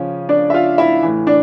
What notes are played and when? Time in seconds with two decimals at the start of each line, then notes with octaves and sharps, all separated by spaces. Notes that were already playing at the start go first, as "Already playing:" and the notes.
Already playing: C#3 F3 C#4
0.29 D4 D5
0.50 E5
0.54 F4 F5
0.78 E4 E5
1.03 A2 E3
1.27 D4 D5